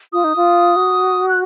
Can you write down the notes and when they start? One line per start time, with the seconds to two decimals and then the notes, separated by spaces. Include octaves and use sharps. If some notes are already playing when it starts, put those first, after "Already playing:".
0.13 F4 D#6
0.24 D#4
0.36 F4
0.76 F#4
1.28 F#6